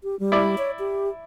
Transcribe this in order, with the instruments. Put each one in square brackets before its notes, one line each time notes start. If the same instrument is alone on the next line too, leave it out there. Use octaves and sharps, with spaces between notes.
[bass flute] G4
G3
[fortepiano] E4 D5
[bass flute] C#5
G4